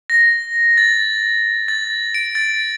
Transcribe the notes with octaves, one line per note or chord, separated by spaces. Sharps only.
A#6
A6
A6
D7
A6